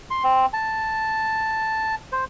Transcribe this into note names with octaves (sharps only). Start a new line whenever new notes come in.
C6
C4
A5
C5